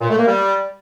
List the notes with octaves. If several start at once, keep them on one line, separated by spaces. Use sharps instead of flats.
A#2
A3
A#3
G3